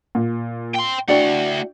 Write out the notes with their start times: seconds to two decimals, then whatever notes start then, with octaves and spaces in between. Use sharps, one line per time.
0.15 A#2
0.74 G5 C6
1.08 A3 D4 E4 F#4 D5 F#5 G5